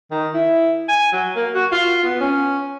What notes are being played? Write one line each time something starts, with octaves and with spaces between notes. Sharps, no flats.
D#3
E4
G#5
F#3
A#3
F#4
F4
B3
C#4